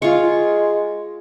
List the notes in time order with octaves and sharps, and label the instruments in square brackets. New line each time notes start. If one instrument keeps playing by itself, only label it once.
[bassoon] G#3 [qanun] F4 C#6